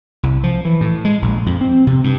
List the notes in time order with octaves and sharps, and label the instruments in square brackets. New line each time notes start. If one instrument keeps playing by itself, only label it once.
[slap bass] C2
F3
E3
A2
G#3
A#1
F2
C4
C3
G2